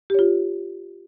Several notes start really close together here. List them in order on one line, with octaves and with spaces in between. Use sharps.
G4 C#5 F4